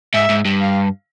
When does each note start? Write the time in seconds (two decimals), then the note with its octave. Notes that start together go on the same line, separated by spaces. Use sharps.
0.14 G#2 E5
0.29 G#2
0.45 G2
0.60 F5